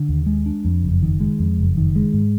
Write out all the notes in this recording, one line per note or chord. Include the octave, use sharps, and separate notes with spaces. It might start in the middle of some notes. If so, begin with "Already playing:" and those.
Already playing: D3
D#2
G#3
D4
F2
F#1
D#3
G#3
F2
F#1
D#3
G#3
G#2